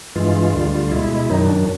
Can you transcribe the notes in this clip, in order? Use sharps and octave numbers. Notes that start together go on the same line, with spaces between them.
G2 E3 G#3 F4
D2 D3 G3
B2 G#3 E4
F#2 D#3 F#3 D#4
D4